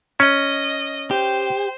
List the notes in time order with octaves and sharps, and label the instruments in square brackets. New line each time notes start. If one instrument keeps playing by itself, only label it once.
[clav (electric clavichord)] C#4 [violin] D#5
[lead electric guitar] G4 [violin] C5